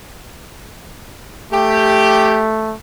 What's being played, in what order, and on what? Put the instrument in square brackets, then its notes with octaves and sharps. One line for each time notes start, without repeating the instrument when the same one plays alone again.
[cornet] A3 [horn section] G4